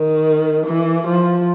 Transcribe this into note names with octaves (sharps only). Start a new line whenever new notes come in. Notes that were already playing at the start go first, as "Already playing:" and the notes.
Already playing: D#3
E3
F3